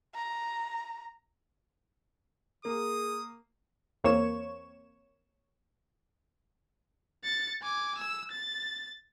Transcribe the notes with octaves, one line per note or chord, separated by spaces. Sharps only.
A#5
A#3 G#4 D#6
E2 A#3 C4 C#5 C#6 E7
A6 C#7
G#5 D6
E6
A6